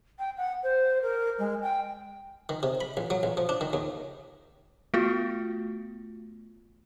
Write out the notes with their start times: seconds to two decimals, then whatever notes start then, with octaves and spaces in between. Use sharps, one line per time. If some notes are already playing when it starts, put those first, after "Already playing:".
0.19 G5
0.37 F#5
0.63 C5
1.02 A#4
1.39 G#3
1.62 G5
2.49 D#3
2.63 C3
2.81 B5
2.97 A1
3.10 F#3
3.23 A1
3.37 F3
3.49 D4
3.61 D#3
3.73 D#2
4.94 A3 B3 F4 F#4